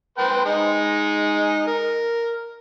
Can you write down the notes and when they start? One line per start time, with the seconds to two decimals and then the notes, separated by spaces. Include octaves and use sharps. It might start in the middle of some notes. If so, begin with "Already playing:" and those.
0.18 B4 C5 G5
0.45 G#3 D#4
1.67 A#4